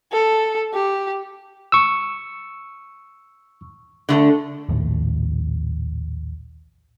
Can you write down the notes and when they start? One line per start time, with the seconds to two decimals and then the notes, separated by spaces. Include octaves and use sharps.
0.12 A4
0.73 G4
1.72 C#6 E6
4.09 D3 A3 A4
4.69 A#1 D#2 A2